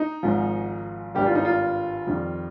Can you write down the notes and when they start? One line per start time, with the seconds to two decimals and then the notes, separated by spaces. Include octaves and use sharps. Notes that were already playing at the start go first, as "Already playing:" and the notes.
Already playing: D#4
0.23 G#1 G#2 F3
1.15 G#1 G2 G3 G4
1.26 F4
1.35 D#4
1.45 F4
2.07 F2 D#3 G3